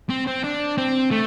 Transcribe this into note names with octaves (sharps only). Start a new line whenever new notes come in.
C4
C4
D4
C4
A3